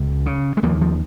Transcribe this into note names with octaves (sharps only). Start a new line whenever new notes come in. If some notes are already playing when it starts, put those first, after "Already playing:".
Already playing: C#2
C#3
G#3
D#2 F3 A#3
F3